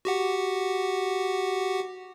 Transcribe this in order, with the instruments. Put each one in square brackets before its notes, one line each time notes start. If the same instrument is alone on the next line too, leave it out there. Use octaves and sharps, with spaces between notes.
[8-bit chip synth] F#4 G4 F#5